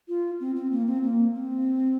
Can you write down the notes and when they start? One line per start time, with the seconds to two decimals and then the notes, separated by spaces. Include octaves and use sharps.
0.08 F4
0.40 C4
0.56 C4
0.72 A#3
0.87 C4
1.03 A#3
1.35 C4